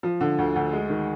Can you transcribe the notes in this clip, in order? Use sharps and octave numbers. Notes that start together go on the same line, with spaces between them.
F3
D3
D2
D2
G#3
D#3